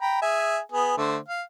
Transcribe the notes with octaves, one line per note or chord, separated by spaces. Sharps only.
G5 A#5 B5
G#4 E5 G#5
B3 G#4
D3 A3 C5
F5